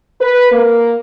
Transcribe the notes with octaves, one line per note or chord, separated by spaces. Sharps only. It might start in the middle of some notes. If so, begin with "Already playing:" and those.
B4
A#3